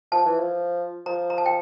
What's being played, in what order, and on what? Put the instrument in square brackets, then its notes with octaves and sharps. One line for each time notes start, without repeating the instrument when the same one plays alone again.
[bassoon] F3 [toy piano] A5
[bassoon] E3
F3
[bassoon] F3 [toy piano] A#5
[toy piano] A#5
A5
G5